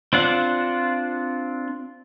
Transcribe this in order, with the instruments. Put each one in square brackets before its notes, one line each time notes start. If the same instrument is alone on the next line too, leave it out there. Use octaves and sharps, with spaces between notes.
[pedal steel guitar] C4 D4 F4 F#5